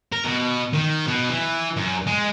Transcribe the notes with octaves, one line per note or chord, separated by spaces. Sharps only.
A#4
B2
D#3
B2
E3
F#2
G#3